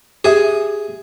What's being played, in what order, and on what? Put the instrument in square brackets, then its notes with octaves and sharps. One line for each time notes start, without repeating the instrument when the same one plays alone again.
[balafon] G4 E5 [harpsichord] G#4